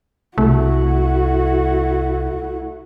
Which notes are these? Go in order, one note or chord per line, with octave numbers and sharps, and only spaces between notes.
C2 A3 E4 F#4